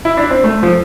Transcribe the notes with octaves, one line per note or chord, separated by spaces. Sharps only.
E4
D4
C4
A3
F3